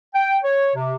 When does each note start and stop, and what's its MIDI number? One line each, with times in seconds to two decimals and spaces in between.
0.14 0.38 79
0.43 0.72 73
0.75 0.95 48